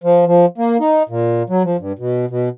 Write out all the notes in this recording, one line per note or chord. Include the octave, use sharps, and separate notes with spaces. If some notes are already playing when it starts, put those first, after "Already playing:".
F3
F3
A#3
D#4
A#2
F#3
F3
G2
B2
B2